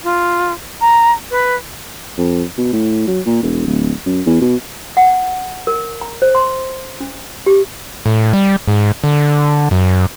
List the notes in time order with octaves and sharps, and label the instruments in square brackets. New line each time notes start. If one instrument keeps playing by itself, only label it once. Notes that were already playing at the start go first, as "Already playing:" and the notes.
[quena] F4
A#5
B4
[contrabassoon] F2
B2
A2
F#3
A#2
E1
D1
F#2
E2
B2
[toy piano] F#5
A#4
A#5
C5
C6
C#4
G4
[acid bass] A2
G3
G#2
D3
F#2